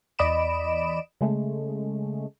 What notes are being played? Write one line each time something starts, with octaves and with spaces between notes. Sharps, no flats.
E2 D5 D#5 B5 D7 E7
C#3 G#3 A3